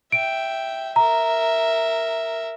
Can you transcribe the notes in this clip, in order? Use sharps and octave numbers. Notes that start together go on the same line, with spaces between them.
E5 G5 D7
A#4 E5 A#5